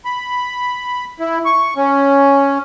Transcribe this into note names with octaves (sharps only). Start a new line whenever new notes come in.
B5
E4
C#6
C#4